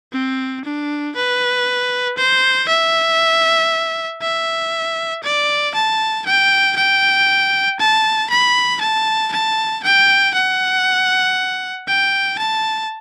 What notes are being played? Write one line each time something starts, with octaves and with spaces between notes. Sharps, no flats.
C4
D4
B4
C5
E5
E5
D5
A5
G5
G5
A5
B5
A5
A5
G5
F#5
G5
A5